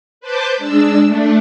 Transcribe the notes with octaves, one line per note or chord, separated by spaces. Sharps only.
B4 C5 A5 D6 G6
G#3 D4 E6
A3 D4